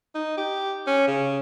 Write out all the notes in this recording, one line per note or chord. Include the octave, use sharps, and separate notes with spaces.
D#4
G4
C#4
C#3